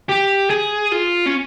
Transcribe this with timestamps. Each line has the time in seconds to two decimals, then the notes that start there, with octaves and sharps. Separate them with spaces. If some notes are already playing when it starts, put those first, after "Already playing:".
0.09 G4
0.50 G#4
0.92 F4
1.26 C#4